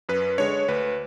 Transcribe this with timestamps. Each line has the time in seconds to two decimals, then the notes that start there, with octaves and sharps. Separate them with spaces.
0.09 F#2 B4
0.38 D3 G#3 D4 C#5
0.68 D2 B4